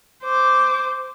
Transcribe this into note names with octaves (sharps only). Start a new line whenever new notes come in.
C5 D6